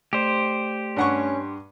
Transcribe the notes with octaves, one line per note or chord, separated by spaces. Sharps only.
A3 G4 C5 D5 D7
G2 C#4 F#5 C#6